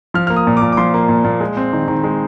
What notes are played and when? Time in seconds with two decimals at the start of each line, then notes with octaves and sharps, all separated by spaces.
0.14 F3 F6
0.27 A#3 F6
0.36 D#6
0.47 A#2
0.57 D6
0.62 A#2
0.72 D6
0.77 F3 C6
0.94 A#3
1.09 A#2
1.25 A#2
1.40 G#3
1.57 C4
1.73 D#3
1.88 D#3
2.04 G#3